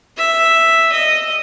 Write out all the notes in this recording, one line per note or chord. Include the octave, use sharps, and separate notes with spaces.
E5
D#5